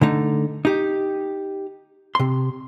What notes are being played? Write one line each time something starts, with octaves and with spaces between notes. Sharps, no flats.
D3 A3 D#4
D#4 G4
C3 C6